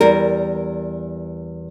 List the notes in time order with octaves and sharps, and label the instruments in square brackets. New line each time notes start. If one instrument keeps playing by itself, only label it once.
[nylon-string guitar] E2 G3 A#4